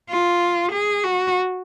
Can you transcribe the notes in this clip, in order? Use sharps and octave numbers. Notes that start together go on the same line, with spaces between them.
F4
G#4
F#4